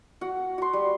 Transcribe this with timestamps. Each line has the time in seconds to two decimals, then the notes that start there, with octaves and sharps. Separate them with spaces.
0.21 F#4 F#5
0.58 F#4 C6
0.73 G3